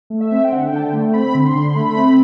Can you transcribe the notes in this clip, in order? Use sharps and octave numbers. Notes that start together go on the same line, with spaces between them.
A3
E5
C4
G5
D3 F#5
G5
D3 A5
G5
A3
C4 B5
D3
C6
D3
C6
A3 B5
C4